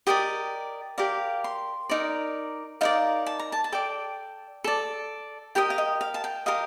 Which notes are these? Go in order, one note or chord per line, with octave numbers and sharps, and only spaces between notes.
G4 A#4 D5 D#5
G4 A#4 D5 F5
C6
D#4 A#4 D5
D#4 A#4 D5 F5
A5
A#5
A5
A5
A4 D5 G5
A4 D5
G4 A#4 D#5 G5
F5
D#5
F5
A5
G5
G4 A#4 D#5 F5